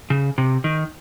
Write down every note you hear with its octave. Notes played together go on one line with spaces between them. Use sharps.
C#3
C3
D#3